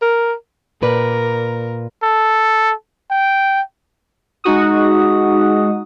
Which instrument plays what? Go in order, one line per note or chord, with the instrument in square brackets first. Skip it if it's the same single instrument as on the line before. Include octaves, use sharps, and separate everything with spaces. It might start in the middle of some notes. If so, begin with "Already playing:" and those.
[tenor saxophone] A#4
[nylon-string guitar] A#2 B4 D5 [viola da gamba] A#4
[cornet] A4
G5
[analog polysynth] G#3 D#4 F#4 D#6